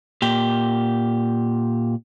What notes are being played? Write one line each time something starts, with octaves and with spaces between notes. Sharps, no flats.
A#2 G4